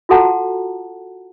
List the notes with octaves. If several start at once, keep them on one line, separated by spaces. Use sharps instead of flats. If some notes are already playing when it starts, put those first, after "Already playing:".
F4 F#4 A4 F#5 A5 A#5